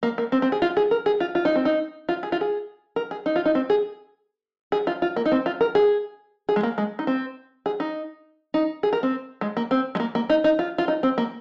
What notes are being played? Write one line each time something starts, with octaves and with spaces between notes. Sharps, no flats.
A#3
A#3
C4
C4
G#4
F4
G#4
A#4
G#4
F4
F4
D#4
C4
D#4
F4
G#4
F4
G#4
A#4
G#4
D#4
F4
D#4
C4
G#4
G#4
F4
F4
A#3
D#4
C4
F4
A#4
G#4
G#4
G#3
A#3
G#3
D#4
C4
G#4
D#4
D#4
G#4
A#4
C4
G#3
A#3
C4
G#3
A#3
A#3
D#4
D#4
F4
F4
D#4
C4
A#3